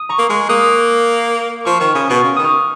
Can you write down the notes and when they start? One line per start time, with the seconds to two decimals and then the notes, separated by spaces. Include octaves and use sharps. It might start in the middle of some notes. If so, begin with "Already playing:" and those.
Already playing: D#6
0.09 A#5 C#6
0.18 A#3
0.29 G#3 C#6 F6
0.49 A#3 D#6 F#6
1.65 F3 C#6 F6
1.80 D#3 C#6 F6
1.94 C#3 B5 D#6
2.09 B2 C#6 F6
2.24 C#3
2.36 D#3 D#6
2.43 C#6 F6